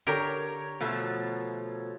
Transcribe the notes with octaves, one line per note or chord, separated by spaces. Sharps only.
D3 G4 A#4 C#5 A#5
B2 F3 A3